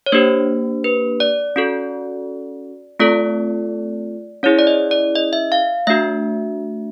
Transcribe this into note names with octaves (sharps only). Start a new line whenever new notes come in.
C#5
A#3 D4 G4 C5
B4
D5
C#4 F#4 A4
A3 C4 F4 A4 D5
C#4 E4 G#4 C#5
D5
D#5
D5
D#5
E5
F5
A3 D4 F#4 E5